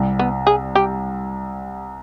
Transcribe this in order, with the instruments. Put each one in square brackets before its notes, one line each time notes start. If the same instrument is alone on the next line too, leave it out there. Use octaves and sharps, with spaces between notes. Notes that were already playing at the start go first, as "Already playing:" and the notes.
Already playing: [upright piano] C2 C3 G3
[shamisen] B3
G#4
G4